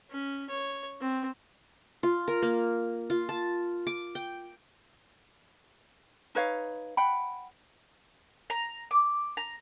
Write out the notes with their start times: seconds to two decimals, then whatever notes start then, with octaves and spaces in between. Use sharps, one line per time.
0.11 C#4
0.49 C#5
1.01 C4
2.03 F4
2.28 A#4
2.42 A#3
3.10 F4
3.29 A5
3.87 D6
4.15 G5
6.35 D#4 B4 C#5 F5
6.97 F#5 G5 B5
8.50 A#5
8.91 D6
9.37 A#5